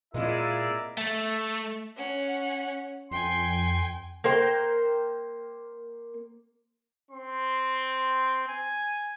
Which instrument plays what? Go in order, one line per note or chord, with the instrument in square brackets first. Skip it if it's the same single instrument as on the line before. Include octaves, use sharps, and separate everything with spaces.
[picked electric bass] A#2 C4 [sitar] G#3 E4 [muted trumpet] F4 [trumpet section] A#4 D5 E5
[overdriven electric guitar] A3
[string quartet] C#4 F#5
[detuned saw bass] F2 [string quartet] G5 G#5 [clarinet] C6
[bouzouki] A#3 A#4 C5 G5
[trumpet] C4 [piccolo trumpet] C6
[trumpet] G#5